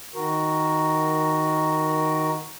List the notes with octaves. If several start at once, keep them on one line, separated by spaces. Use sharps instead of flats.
D#3 F#4 A#4